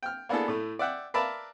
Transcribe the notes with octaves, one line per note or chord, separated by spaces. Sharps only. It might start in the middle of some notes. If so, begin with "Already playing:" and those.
G5 F6
A#3 B3 D4 E4 G#4 A4
A2 A3
D5 E5 F#5 G5
A#4 B4 D5 E5 F5 A5